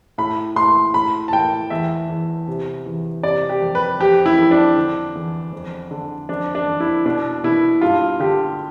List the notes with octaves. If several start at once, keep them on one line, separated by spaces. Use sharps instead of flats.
A2 B5
A2 C6
A2 B5
A5
A2 G5
E2 E5
E2
C3
E2
C3 D5
G4
F2
B4
F2 G4
E4
F2
D4
D3
E2
F2
D3
F2 D4
D4
F2
E4
B2 D4
B2 E4
G2 F4
D3 G4